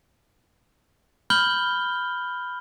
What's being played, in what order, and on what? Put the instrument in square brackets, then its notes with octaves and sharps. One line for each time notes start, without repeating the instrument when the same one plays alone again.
[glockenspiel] B5 F6 G6 F#7 G7